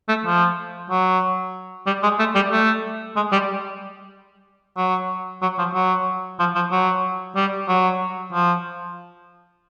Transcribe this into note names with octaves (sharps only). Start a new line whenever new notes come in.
A3
F3
F#3
G3
G#3
A3
G3
A3
G#3
G3
F#3
F#3
F3
F#3
F3
F3
F#3
G3
F#3
F3